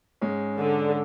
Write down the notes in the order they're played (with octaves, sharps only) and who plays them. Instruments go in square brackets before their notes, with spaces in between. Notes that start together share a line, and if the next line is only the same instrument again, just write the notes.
[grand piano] G#2 G#3 C#4
[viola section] D3